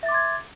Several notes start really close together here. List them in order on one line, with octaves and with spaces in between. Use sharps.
E5 A6 D6 C6 G#6